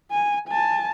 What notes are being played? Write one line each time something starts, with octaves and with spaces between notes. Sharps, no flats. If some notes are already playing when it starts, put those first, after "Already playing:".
G#5
G#5 A5